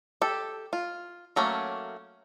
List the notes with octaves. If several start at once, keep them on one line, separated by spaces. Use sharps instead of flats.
G4 A4
F4
F#3 A3 A#3 C#4